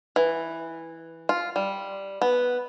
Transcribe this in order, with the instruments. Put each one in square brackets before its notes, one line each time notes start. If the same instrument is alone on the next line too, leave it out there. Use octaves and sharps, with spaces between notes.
[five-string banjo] E3
F4
G3
B3